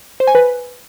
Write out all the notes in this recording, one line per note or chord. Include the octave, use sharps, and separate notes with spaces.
C5
G#5
B4